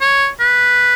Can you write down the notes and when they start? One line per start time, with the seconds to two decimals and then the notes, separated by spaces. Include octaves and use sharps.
0.01 C#5
0.40 B4